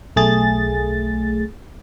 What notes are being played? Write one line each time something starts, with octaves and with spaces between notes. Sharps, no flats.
B1 A3 G#4 A6